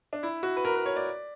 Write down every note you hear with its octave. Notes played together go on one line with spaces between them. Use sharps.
D4
E4
F#4
B4
A#4
B4
C#5
D5